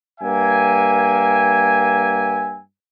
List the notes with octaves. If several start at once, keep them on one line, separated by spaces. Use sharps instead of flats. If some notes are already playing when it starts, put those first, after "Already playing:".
G2 A#3 E5 G5 G#5